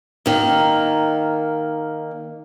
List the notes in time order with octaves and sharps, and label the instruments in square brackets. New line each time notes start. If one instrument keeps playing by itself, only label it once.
[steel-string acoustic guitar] D#3 A#3